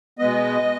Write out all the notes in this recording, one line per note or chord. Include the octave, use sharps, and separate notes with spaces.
B2 G#3 B3 D#5